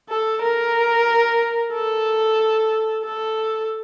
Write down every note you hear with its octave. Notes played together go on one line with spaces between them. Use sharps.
A4
A#4
A4
A4